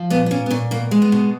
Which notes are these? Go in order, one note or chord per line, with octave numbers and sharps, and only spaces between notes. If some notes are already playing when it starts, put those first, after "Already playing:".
Already playing: F3
A#2 B3
B3
A#2 C#4
B3
A#2 C#4
B2 A#3
G#3
B3
B2